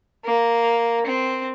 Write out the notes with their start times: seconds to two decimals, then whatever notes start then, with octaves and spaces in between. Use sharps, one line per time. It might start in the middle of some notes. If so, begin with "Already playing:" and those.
0.25 A#3
1.06 C4